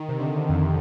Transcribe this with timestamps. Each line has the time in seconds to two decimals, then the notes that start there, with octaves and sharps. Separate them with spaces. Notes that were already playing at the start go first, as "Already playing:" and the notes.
Already playing: D#3
0.09 C3
0.20 D3
0.49 F2